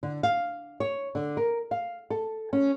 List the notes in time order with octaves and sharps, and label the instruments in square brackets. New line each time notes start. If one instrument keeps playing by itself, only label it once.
[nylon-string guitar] D3
F5
C#5
D3
A#4
F5
A4
C#4